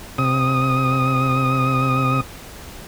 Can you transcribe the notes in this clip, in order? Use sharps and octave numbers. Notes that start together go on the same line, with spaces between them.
C3 D#6